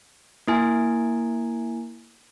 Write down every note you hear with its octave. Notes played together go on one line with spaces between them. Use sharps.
A#3 E4 G#5